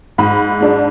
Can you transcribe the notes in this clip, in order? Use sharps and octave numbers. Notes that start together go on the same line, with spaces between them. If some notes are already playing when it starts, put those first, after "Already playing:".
G#2 B5
G#3 D4